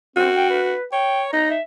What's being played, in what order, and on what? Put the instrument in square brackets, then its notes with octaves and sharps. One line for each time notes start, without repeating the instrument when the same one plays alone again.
[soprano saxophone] C4 [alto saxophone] F#4
[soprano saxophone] G5
B4
[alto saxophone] C#5 [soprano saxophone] G5
[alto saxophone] D#4 [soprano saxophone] A#5
[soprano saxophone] E5